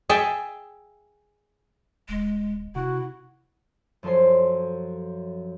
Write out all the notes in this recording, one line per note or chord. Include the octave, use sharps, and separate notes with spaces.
G#4 E5 G5 A5
D#1 G#3
C3 E4 F#4
F#2 F3 A4 C#5 C6